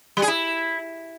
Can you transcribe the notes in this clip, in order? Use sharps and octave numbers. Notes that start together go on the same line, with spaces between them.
G3
G#4
E4